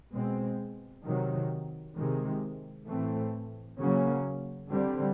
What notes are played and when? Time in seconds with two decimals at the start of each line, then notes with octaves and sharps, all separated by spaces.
0.12 B2 G#3 C4
1.05 C3 D#3 F#3
1.96 C3 D#3 G#3
2.87 A2 E3 A3 C4
3.79 C#3 F#3 A#3 C#4
4.70 D3 G3 C4